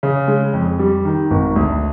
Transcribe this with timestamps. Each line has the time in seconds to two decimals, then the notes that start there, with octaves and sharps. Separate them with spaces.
0.03 C#3
0.28 G#3
0.53 F2
0.79 G3
1.05 D#3
1.31 G#1
1.56 D2